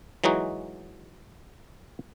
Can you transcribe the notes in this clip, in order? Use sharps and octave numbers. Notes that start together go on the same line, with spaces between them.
E3 F#3 G#3 D#4 F#4